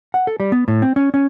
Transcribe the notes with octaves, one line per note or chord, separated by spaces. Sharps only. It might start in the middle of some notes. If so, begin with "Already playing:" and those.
F#5
A4
G3
B3
A2
C4
C#4
C#4